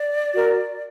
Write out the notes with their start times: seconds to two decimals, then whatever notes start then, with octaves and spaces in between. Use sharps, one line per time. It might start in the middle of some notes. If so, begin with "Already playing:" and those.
Already playing: D5
0.34 F#4 A#4